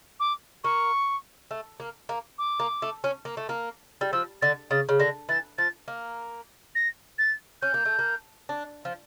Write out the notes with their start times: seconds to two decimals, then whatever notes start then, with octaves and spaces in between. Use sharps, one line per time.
0.20 D6
0.64 A#3 C#6
1.51 A3
1.80 A#3
2.09 A#3
2.38 D6
2.60 A#3
2.82 A3
3.04 C#4
3.25 A#3
3.37 A3
3.49 A#3
4.01 G3
4.13 F3 E6
4.42 D3 A6
4.71 C#3 A6
4.89 C#3
5.00 D3 A#6
5.29 E3 A6
5.58 F3 A6
5.88 A#3
6.75 A#6
7.18 A6
7.62 C#4 G6
7.74 A#3
7.85 A3
7.99 A#3
8.49 D4
8.85 F3